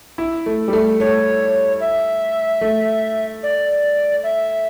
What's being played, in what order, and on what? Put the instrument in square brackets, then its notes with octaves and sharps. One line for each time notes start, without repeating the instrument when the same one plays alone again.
[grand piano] E4
A3
G3
A3
[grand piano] A3 [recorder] C#5
[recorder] E5
[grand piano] A3
[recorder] D5
E5